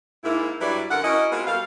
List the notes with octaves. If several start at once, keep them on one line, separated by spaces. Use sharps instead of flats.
G#2 A#3 E4
G2 F#3 G3 E4 B4 D5
F#2 D3 A4 A#4 F#5
C#4 E4 F#4 A#4 D#5
G#3 B3 C4 F4 F#4 A#4
B2 G3 A4 F5